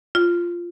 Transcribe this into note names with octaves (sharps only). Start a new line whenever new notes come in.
F4